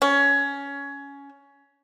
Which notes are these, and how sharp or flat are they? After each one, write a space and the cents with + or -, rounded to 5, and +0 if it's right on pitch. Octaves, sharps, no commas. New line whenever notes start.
C#4 +15